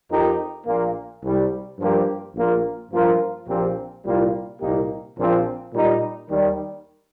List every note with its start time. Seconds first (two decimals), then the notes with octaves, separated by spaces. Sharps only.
0.10 F2 F3 D#4 G4 A#4
0.67 A#1 A#2 A#3
1.23 C2 C3 G3
1.79 G2 F3 A#3 G4
2.35 A#1 A#2 A#3 F4
2.91 G2 F3 A#3 F4 A#4
3.48 A#1 A#2 F3 C4 G4
4.05 C2 A#2 G3 A#3 F4
4.61 C2 A#2 A#3 D#4 G4
5.17 A#1 A#2 F3 C4 F4
5.74 A#2 G3 D#4
6.30 D#2 D#3 G3